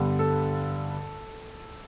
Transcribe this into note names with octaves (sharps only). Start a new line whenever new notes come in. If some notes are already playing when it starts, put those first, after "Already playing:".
Already playing: G2 D3 G3 B3
A4